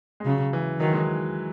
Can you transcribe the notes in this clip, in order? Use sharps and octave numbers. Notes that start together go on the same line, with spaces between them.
G#3
C#3 F#3
E3
D#3 F#3
G#3